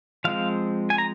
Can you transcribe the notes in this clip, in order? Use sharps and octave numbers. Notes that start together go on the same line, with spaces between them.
F3 G#3 C4 F5
G#5
A#5